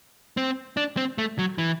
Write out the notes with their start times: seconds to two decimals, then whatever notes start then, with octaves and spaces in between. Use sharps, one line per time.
0.37 C4
0.77 D4
0.97 C4
1.18 A3
1.39 F#3
1.58 E3